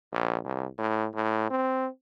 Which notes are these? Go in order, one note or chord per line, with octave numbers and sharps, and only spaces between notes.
A#1
C2
A2
A2
C4